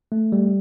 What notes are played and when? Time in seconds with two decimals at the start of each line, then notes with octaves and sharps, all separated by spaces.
0.12 A3
0.32 G3